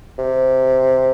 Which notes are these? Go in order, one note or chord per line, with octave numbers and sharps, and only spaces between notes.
C3